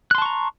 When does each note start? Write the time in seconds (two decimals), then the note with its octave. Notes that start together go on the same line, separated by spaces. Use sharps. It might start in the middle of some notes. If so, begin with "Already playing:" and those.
0.11 F#6
0.15 C6
0.18 A5
0.22 C#6
0.26 A#5